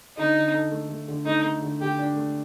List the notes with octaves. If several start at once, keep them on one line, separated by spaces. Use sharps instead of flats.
D3 D#4
D3
A4
A3
A3
D3
A3 D#4
A3
D3
D3 G4
D4
A3